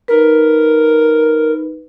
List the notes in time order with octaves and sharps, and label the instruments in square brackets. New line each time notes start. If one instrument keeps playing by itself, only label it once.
[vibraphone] D#4 B4 [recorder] A#4